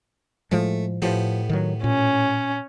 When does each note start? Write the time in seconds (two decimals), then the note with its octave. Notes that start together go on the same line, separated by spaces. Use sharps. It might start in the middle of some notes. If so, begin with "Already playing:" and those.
0.52 A2 F3 G#3 A3
1.02 A2 F3 B3 G4
1.49 D#3 F#3
1.84 A#2 C#4